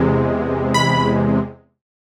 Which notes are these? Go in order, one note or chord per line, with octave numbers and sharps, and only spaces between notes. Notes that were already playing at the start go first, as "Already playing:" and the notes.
Already playing: E2 C3 G#3
B5